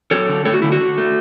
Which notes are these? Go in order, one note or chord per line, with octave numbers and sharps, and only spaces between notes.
F#3 A4 C#5
D3
A3 A4 C#5
F#4
D3 E4
F#4
D3
A3